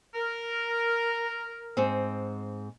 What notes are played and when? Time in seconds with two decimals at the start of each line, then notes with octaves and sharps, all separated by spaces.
0.15 A#4
1.77 G#2 C4